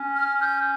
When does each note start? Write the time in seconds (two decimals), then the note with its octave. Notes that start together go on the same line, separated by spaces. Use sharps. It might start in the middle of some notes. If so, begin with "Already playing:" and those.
Already playing: C#4
0.16 F6
0.41 G6